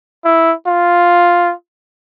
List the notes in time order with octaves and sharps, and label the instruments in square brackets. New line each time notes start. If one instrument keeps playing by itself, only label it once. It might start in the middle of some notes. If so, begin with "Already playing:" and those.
[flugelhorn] E4
F4